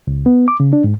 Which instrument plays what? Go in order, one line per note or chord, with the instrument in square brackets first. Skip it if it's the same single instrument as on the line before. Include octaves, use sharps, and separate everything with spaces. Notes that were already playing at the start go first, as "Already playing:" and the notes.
[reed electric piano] C#2
B3
D6
C#3
D4
G#2